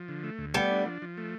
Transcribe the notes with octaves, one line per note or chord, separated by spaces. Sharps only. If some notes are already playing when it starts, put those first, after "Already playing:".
Already playing: F3
D3
A3
D2
G3 A3 B3
D4
F3
F3
A3